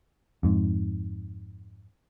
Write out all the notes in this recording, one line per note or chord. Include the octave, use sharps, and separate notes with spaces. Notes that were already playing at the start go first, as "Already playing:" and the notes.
F2 G#2